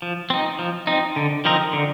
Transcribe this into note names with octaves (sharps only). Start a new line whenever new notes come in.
F3
C4 D#4
F3
C4 D#4
D3
F3 C4 D#4 A#4
D3